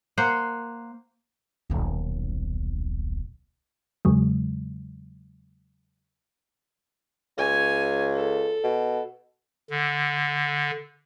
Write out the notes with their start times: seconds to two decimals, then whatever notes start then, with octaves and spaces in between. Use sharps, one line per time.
0.18 A#3 C5 F#5
1.70 D#1 B1
4.05 E2 C#3 F#3 G#3
7.38 C#2 C#5 G#5
8.14 A4
8.64 B2
9.70 D3